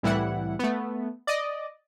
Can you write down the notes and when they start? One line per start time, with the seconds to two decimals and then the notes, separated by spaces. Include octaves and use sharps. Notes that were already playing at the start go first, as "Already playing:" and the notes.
0.03 C2 A2 E3 G3 E4 F#5
0.59 A3 B3
1.27 D5 D#5